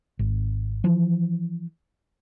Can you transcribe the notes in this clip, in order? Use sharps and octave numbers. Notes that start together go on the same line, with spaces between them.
G#1
E3 F3